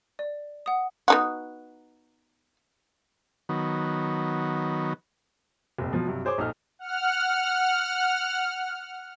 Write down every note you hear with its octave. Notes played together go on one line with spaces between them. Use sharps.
D5
F#5 D#6
B3 D#4 F#4
D#3 F#3 B3
F1 A#1
B2 F3 F#3
G2 C3 F#3
G#4 C5 C#5 D6
A#1 D#4 A4 F6
F#5 F6